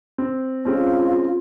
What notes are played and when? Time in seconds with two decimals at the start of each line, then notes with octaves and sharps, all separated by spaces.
0.18 C4
0.65 G#3 C4 C#4 F4